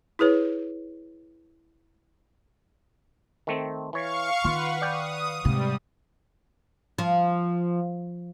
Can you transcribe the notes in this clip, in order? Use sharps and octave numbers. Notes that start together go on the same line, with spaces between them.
E4 G#4 B4 C#5
D#3 A3 C4
E3 C#5 F5 C#6
D#3 F4 B4 F#5
D5 G5 D#6
G#2 C3 G3
F3